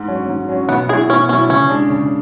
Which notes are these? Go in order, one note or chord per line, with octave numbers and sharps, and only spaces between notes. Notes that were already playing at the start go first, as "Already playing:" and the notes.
Already playing: G#2
F#3 C#4
G#2
F#3 C#4
B1 B3
B2 F#3 B3 E4 G#4
B1 C#4
B2 F#3 B3 C#4 E4
C#3 C#4
G#3 D4
C#3